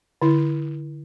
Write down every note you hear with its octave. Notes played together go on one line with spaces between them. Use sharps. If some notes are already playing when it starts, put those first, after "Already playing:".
D3 E4